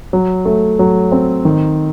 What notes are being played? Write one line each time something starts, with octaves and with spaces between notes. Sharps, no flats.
F#3
A3
F#3
C4
D#3